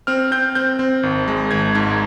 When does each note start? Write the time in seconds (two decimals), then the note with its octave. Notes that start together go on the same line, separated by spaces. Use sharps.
0.07 C4 F6
0.31 C4 G6
0.55 C4 G6
0.79 C4
1.03 G#1
1.28 G#3
1.51 G#1 G#6
1.75 G#2 G#6